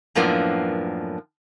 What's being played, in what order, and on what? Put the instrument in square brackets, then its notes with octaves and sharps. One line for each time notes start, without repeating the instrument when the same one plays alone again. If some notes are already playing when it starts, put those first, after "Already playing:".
[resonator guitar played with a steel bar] F#2 A2 F3 A#3 B3 D4